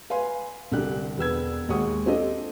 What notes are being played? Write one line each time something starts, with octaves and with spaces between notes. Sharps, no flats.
B4 F5 G#5 C6
C2 D3 G4 F#6
E1 B4 E6 G#6
D#2 G#3 F#5 C#6 D#6
C4 D4 F4 G4 A4 D#5